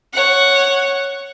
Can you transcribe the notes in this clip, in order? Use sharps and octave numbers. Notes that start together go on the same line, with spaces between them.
C#5 F#5